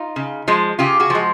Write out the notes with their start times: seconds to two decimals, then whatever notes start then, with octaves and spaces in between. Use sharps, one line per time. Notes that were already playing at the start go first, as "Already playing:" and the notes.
Already playing: D#4 F4
0.16 C#3
0.48 F3 G#3
0.79 C#3 F4 G4
1.00 F#4 G#4
1.10 F3 G#3